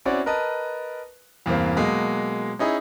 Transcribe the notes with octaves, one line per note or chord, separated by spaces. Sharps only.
C4 C#4 E4 F#4 D5 F#5
A#4 B4 D#5 A5
E2 G2 C3 A#3 C4
B2 F#3 G#3 A#3
C#4 D#4 E4 G#4